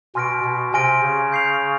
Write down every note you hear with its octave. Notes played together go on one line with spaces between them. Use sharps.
B2 G#5 C6 F6 A#6 D7
B2
C3 G#5 C6 F6 A#6 D7
C#3
G6 C7 F7